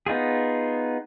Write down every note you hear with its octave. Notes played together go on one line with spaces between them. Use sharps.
B3 D#4 F4 G#4